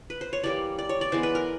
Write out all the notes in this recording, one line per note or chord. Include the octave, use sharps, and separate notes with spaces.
B4
C5
C#5
E3 G3 A#3 D5
D5
C#5
D5
E3 G#3 B3 C5
B4
A#4